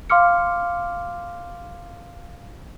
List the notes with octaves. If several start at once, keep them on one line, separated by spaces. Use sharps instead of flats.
F5 C6 D6 F6 C#7